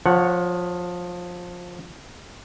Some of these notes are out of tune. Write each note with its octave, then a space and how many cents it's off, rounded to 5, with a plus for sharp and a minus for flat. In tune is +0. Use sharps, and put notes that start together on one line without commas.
F3 +20 C#5 +0 F#5 +0